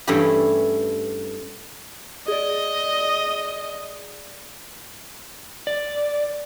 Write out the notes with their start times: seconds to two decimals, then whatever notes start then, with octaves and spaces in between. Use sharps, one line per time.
0.07 G2 E3 A3 C#4 E4 G4
2.28 G#4 D5 D#5
5.67 D5